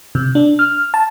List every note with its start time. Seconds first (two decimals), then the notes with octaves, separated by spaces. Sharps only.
0.15 C3
0.35 D4
0.59 F6
0.94 A5